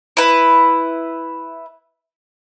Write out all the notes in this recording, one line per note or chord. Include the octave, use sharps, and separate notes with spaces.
E4 B4